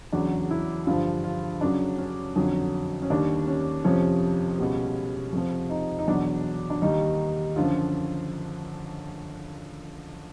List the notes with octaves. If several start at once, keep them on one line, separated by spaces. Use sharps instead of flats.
E2 C#3 F#3 D4
E4
G2 D3 F3 F4
F4
F#2 C#3 F#3 D4
C#4
F2 D3 F#3
C#4
D#2 D#3 G3 D4
C#4
F2 C3 F3 C#4
C#2 B2 G3
F2 C3 F3
D#4
D#4
E2 B2 F#3 D4
D4
D#2 D#3 G3 D#4
F#2 D3 F3 F4